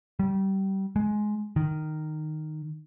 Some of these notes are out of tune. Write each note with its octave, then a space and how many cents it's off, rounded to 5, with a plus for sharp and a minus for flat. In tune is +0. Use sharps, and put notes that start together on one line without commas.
G3 -25
G#3 +15
D#3 -10